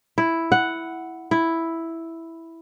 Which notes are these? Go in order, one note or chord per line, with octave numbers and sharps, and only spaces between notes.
E4
F#5
E4